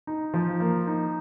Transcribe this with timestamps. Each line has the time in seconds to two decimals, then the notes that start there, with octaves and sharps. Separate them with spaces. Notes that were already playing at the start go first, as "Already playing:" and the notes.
0.07 D#4
0.34 F3
0.60 A#3
0.87 D#4